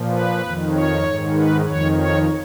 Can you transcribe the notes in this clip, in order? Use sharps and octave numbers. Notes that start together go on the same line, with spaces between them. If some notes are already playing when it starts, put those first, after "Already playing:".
Already playing: A#2 F3
B4
F2 D#3
C#5
G#2 D#3
B4
F2 D#3 C#5
C#5